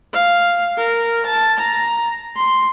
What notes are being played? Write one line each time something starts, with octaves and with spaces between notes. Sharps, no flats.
F5
A#4
A5
A#5
C6